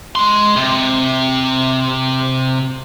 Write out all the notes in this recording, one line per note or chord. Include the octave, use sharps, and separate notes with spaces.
G#3 C6
C3